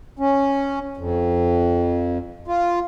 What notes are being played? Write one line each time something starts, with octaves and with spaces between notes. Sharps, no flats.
C#4
F2
F4